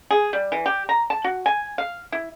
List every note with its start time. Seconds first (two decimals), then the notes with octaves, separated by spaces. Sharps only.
0.11 G#4
0.33 G3
0.52 E3
0.66 G4
0.89 A#5
1.10 A5
1.24 F#4
1.46 G#5
1.78 F5
2.12 E4